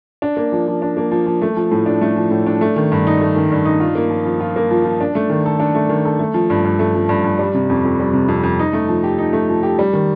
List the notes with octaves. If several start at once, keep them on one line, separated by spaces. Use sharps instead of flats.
D4
A#3
F3
F3
D4
A#3
F3
F3
A3
F3
A2
D4
A3
F3
A2
D4
A3
D#3
G2
D#4
A3
D#3
G2
D#4
F4
A#3
F3
F3
F4
A#3
F3
F3
D4
A3
D#3
A4
D4
A3
D#3
A4
A3
F3
G2
G2
A3
F3
G2
G2
G3
C3
F2
F2
G3
C3
F2
F2
D#4
A3
F3
G4
D#4
A3
F3
G4
G3
D#3